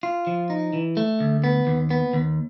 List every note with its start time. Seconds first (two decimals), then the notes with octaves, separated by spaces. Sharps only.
0.03 F4
0.27 F3
0.50 D#4
0.73 E3
0.97 A3
1.20 D2
1.44 B3
1.67 D#2
1.90 B3
2.13 D#2